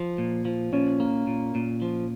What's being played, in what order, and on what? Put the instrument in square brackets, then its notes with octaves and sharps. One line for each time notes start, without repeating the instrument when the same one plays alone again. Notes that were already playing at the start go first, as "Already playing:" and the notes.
Already playing: [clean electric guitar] F3
A#2
F3
[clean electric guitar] A#2 [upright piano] C#4
[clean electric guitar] A#3
A#2
A#2
F3